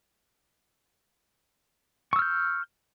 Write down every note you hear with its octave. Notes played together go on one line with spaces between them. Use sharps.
C#6 E6 F6 G6